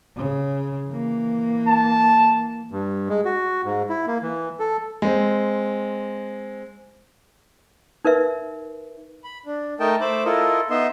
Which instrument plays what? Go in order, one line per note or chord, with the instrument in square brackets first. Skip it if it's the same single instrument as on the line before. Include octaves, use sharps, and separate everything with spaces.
[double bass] C#3
E3 A#3
[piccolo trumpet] A5
[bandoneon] G2
G#3
F#4
G#2
E4
A#3
E3
A4
[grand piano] G#3 C4
[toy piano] D#4 A#4 B4 E5
[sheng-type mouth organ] B5
D4
A3 D#4 A#4 D#5 G5 A5
A3 C5 E5 B5 D6
E4 F4 A4 A#4 D#5
B3 D#4 D#5 E5 C6